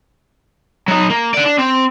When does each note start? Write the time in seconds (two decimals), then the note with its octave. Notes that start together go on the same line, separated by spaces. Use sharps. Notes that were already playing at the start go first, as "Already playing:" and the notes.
0.88 F#3 D#4
1.10 A#3
1.34 D5 F#5
1.46 D4
1.59 C4